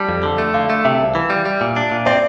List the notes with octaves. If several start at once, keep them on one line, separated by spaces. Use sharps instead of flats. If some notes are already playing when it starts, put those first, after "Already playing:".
Already playing: G3 A5
F2
D3 A5
A3
D3 F5
A3
C3 E5
C2
E3
G3
G3
A#2
D4
A#2
C4 D5